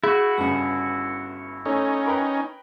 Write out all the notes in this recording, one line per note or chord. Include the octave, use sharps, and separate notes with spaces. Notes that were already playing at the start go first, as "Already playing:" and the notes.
E4 F#4 G#4
G1 G2 C#3 C#7
A3 C#4 D#4 C#5
A#4 B4 G5